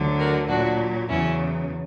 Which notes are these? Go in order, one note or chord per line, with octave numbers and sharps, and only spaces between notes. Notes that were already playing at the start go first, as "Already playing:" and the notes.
Already playing: D2 D3 F#3
F#4 A#4
A#2 F#3 D4 F#4
E2 C#3 F#3 C#4 E4